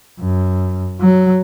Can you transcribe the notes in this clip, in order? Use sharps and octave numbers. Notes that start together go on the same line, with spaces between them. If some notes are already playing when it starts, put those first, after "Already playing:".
F#2
F#3